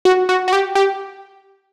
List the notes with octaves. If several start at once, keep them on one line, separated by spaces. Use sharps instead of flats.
F#4
F#4
F#4
G4
G4